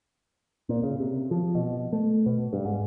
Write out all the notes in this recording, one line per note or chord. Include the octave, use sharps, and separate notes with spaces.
A#2
C#3
C3
F3
B2
A3
B2
G2
G#2